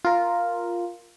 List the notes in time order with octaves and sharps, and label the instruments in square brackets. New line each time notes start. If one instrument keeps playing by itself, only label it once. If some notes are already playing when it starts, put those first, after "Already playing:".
[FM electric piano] F4 A#4